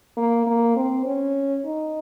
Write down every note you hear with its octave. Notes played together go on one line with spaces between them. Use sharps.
A#3
A#3
C4
C#4
D#4